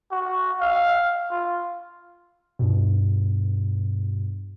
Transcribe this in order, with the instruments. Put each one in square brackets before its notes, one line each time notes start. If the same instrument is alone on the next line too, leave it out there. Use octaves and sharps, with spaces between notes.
[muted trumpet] F#4
F5
F4
[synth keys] G2 B2